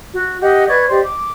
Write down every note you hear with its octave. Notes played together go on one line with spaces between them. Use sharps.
F#4
G4 D#5 F#5
B4 D5 C#6 G#6
G4 C5 D5 D#5
D6